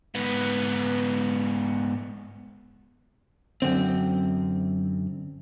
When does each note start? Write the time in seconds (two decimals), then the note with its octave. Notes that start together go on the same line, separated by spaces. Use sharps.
0.15 G#2 B3
3.62 F#2 D3 C4